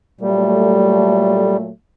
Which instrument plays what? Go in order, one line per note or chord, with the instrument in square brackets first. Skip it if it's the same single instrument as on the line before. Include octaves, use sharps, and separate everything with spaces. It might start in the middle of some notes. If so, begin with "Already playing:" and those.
[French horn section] A#2 F#3 A3 [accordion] G3